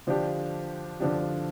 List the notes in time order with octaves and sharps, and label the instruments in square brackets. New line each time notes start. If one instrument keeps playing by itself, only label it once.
[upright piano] D3 F3 D4 G4
D3 F3 D4 G4